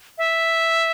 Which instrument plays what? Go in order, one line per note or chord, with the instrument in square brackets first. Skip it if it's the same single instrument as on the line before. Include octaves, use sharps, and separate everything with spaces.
[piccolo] E5